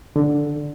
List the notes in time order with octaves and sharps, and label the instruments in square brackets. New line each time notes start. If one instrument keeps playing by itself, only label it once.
[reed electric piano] D3